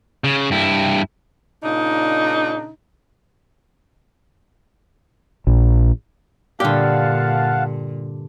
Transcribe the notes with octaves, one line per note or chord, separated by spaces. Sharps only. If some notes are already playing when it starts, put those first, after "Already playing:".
C#3
G2 E4
A#2 C#3 D4 D#4
A#1
G2 A#2 D3 G4 F5 F#5 A5